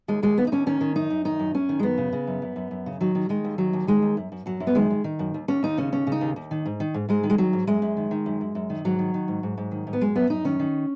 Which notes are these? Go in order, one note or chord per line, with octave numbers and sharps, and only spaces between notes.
D#2 G#3
D#2 G#3
D#2 B3
D#4
D#2 C#4
D#3 C#4
D#3
F#2 D#4
F#2
D#3 D#4
F#2
F#2 C#4
D#3
G#3
F#2 B3
C#3
C#3
F#2
F#2
F#2
F#2
C#3
D#3 F#3
D#3
D#3 G#3
D#2
D#3 F#3
D#2
D#3 G#3
D#2
F#2
F#2
F#2 F#3
F#2
B3
D#3 G#3
D#3
D#3
F#2
D#2
D#2 C#4
D#2 D#4
C#3 C#4
D#2 C#4
C#3
D#4
D#2
D#2
D#3
G#2
D#3
G#2
G#2 G#3
D#3
G#3
D#3 F#3
G#2
F#2 G#3
F#2
D#3
D#3
F#2
F#2
F#2
D#3
G#2 F#3
D#3
D#3
G#2
G#2
G#2
D#3
G#2
B3
F#2 G#3
F#2 B3
F#2 D#4
D#3 C#4
D#3